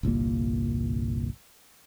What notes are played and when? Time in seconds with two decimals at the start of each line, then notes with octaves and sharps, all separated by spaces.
0.03 G1 C2 A#2 A#3